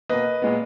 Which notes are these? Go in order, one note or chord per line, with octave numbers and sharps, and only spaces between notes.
B2 A#3 B4 D#5
A#2 G#3 B3